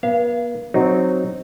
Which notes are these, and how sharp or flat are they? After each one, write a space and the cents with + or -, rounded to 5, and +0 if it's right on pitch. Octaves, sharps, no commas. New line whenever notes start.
B3 -45 F5 -25
F#3 +0 C4 +0 D#4 -5